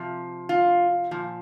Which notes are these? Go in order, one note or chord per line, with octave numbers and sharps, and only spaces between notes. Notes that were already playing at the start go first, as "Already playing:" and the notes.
Already playing: C3 F3
F4
A#2 F3